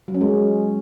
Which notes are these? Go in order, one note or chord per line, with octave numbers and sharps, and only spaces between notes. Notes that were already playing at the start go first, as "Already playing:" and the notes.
F#3
C#4
G#3